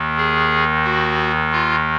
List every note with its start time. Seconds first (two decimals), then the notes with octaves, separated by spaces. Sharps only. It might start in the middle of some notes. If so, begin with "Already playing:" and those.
Already playing: D#2 D#3
0.17 G#4
0.85 F#4
1.52 F4